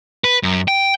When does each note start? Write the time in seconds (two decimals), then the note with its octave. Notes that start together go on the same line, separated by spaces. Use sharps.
0.24 B4
0.43 F#2
0.68 G5